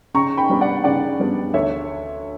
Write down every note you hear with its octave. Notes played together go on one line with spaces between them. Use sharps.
C#3 A#5 C#6
G5 B5
G3 B3 D4
D5 F#5
C#3 D5 F#5
G3 B3 D4
D2 C#5 E5